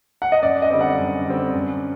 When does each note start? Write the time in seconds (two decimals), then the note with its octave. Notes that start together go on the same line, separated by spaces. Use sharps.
0.22 F#5
0.32 D#5
0.43 F#2 D5
0.62 D#5
0.70 D3 G3 C4
0.81 F#5
0.98 F#2
1.26 D3 G3 C4
1.54 F#2